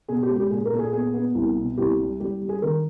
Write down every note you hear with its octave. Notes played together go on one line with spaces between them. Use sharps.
B2 G#4
G4
G#3
G4
A#2 G#4
A#4
A#2 A4
G#4
B3 G#4
B3
C2
B2
C2 G4
G3
G3 G4
G3
G#4
D#3 A#4